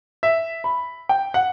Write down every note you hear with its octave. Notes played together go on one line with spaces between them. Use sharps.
E5
B5
G5
F#5